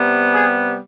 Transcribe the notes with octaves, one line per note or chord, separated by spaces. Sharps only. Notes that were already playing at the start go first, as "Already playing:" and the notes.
Already playing: C3 G3 B3
G#4